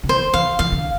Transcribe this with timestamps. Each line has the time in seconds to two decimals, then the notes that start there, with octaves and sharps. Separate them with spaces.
0.03 D3
0.09 E3 C5
0.34 E3 F5
0.59 E3 F5
0.72 D3